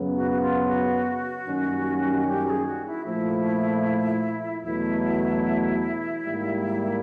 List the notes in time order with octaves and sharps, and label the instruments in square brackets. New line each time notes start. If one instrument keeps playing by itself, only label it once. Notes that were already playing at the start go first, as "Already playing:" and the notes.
Already playing: [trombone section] F#2 C#3 F#3 B3
[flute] F#4
F#4
F4
F#4
[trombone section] F#2 D#3 G3 A#3 C#4
[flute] G4
A#4
G#4
F#4
E4
[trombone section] A#2 F3 A3 [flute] E4
[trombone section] E2 B2 F#3 A3 [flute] E4
[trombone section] G#2 D#3 G3 A#3